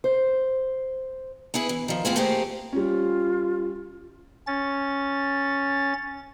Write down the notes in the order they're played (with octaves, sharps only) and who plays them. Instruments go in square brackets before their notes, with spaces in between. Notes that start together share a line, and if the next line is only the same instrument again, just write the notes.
[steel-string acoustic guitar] C5
B3 E4 G#4 B4
E3
D#3 F3
A2 B3 C4 F4 G#4 C5
A3 A#3 C4 G4 G#4 C5
[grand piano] G3 C#4 [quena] F4
[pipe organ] C#4 A6